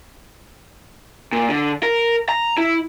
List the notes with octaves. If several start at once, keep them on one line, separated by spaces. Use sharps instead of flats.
A#2
D3
A#4
A#5
E4